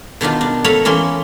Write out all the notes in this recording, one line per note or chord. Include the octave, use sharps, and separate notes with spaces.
B2 D#3 D4 F4
D4
A4 C#5 F5 G#5 A#5 B5
E3 A#3 C#4 C6